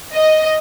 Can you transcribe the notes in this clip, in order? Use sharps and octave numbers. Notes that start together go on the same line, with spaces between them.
D#5